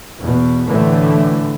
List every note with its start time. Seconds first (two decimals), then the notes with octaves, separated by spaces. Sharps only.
0.19 E2 B2
0.67 A2 D3 E3 A3